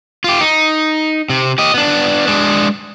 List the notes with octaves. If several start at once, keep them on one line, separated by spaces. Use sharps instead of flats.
F4 G4
D#4
C3
G4 D#5
B3 D4
G#3 D4